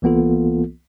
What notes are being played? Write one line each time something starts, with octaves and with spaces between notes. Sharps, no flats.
C2 E3 A#3 B3 F4 A4